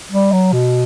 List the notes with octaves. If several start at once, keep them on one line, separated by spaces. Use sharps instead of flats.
G3
F#3
B2